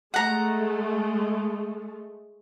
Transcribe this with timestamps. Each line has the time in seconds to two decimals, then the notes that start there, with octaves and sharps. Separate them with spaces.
0.14 G#3 A3 F#5 A#5